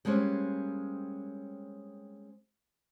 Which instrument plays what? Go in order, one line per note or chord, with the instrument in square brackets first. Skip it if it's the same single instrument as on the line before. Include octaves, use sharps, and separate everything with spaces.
[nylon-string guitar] G3 G#3 A#3 C4 C#4